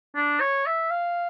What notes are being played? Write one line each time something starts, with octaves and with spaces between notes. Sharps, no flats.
D4
C#5
E5
F5